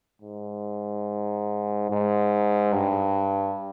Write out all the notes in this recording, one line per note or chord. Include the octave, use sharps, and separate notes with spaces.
G#2
G#2
G2